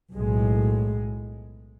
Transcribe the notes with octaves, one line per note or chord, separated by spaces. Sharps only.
B1 A2 G#3